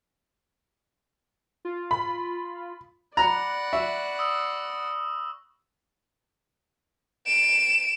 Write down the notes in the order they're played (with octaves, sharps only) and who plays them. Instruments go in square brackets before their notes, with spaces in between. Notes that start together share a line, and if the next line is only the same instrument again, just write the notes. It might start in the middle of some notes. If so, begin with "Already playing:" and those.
[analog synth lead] F4
[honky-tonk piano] B5
[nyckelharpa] D5 F#5 [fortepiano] A#5 [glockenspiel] B5 F#6 A#6
[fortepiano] E5 [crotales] C#6
[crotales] D#6 E6
[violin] D7 E7